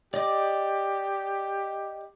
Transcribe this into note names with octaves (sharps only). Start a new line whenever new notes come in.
G4 D5 D#5 D6